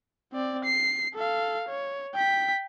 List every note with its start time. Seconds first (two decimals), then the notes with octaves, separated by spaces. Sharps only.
0.33 C4 D5
0.65 C7
1.14 A4 F5
1.69 C#5
2.14 G5 B6